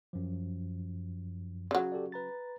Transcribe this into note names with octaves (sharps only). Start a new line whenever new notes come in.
F#2 F3
C#3 F#3
G4 A4 D5
B4 A#5 A6